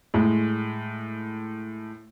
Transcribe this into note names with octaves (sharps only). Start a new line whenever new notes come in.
A2 G#3